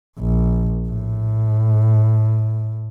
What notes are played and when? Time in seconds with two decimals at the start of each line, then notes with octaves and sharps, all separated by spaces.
0.19 A#1
0.88 A2